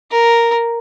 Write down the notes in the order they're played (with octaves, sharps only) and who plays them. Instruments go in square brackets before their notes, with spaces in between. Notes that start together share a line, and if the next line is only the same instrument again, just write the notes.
[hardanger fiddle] A#4